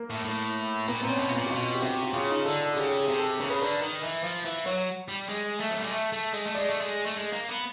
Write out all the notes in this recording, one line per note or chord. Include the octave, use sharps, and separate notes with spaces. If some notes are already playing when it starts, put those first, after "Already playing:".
Already playing: A#3
A2
A2
A#2 B3
A#2 C4
C#4
B2
F4
A#2
F#4
B2 F4
G4
C3 F#4
F#4
C#3 F4
D#4
D3 A4
A4
G#4
C#3 G4
G#4
C3
A4
C#3 A#4
B4
D3 A#4
D#3
E3
F3
E3
F#3 C#5
G3
G#3
A3
F#3
G3
G#3
A3
A3
G#3
A3
G#3 D5
A3
G#3
A3
G#3
A#3
B3